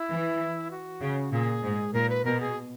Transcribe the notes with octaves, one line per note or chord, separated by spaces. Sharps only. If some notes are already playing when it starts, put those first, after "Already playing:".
Already playing: E4
E3
F#4
C#3
A#2 G#4
G#2
A#2 A#4
B4
B2 A#4
G#4